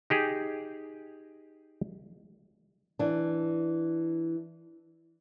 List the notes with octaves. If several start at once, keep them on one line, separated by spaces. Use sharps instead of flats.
D#4 G4 G#4
E3 D4